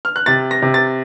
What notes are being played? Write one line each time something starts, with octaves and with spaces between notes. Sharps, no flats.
F6
F#6
C3 A6
A#6
C3
A6